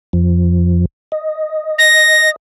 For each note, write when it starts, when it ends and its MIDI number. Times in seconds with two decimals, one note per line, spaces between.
0.13 0.86 41
0.13 0.86 53
1.12 2.36 75
1.79 2.30 94